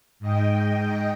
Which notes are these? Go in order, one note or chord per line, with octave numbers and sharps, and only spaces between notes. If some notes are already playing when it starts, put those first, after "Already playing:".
G#2 D#5 G5